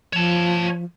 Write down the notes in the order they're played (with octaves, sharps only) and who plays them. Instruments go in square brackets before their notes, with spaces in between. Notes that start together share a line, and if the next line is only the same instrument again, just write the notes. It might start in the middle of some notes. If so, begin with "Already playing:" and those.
[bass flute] F3 [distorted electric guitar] C#5 A5